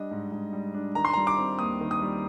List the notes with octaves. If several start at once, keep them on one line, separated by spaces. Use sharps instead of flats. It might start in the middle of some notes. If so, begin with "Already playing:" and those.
Already playing: G3 D4 D#5
G#2
G#2
G3
D4
D#3 A#5
C6
G3 A#5
D6
C4
D#2 D#6
D#3
D#6
G3